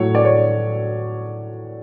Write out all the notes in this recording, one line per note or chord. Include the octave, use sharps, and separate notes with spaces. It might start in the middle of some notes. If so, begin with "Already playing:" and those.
Already playing: A2 F#3 A3 C#5
D5
C#5